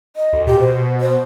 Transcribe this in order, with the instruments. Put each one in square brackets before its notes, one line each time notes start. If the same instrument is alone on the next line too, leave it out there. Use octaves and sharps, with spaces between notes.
[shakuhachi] D#5
[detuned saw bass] D2
[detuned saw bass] A#2 [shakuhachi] G4
[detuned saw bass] B2 [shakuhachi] C5
[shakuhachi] C5